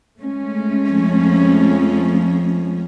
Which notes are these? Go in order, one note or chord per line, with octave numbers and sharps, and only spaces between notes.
G#3 A3 C#4
F2 F3